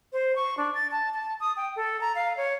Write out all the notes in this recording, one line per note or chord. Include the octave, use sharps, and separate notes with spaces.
C5
C#6
D4
A6
A5
A5
D#6
G5
A4
A#5
F5
C#5